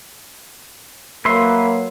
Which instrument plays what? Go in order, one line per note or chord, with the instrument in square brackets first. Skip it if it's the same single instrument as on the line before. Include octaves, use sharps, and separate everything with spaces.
[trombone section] F#3 A#3 [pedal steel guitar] B4 E5 C6